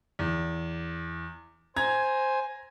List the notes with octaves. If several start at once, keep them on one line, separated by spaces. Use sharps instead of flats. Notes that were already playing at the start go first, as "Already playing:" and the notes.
E2
C5 G#5 A#5 G#6